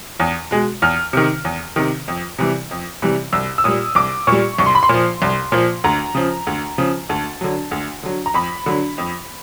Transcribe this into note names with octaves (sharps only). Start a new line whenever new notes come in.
E2
B2 G#3
E2 F6
C3 D#3
E2
C3 D#3
F2
C3 E3 G3
F2
C3 E3 G3
C2 E6
E6
A#2 G3 D#6
C2 D6
A#2 G3 C#6
C2 C#6
C6
B5
C6
A#2 F3
C2
A#2 F3
D2 A#5
C#3 F3
D2
C#3 F3
D2 A5
D3 F#3
D2
D3 F#3
A#5
F2 B5
D3 F#3
F2